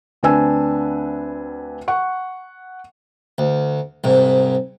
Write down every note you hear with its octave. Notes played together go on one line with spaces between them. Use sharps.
D2 C4 D4 B4 G#5 E6
F#5 C#6
D2
C2 G#2